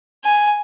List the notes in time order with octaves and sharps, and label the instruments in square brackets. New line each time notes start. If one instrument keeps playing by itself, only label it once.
[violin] G#5